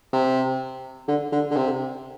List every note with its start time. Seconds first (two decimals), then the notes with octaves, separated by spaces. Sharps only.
0.13 C3
1.08 D3
1.32 D3
1.51 D3
1.56 C3